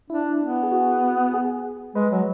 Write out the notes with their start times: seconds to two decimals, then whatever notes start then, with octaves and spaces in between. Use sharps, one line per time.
0.10 D4 E4
0.40 B3
0.63 G#4
0.71 F#4
1.34 G#4
1.95 G#3 B4
2.11 F#3